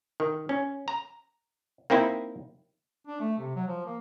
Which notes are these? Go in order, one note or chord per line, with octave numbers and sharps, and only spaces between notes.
D#3
C#4
A#5
A#3 C4 D#4 E4
D4
A3
C3
F#3
F3
A#3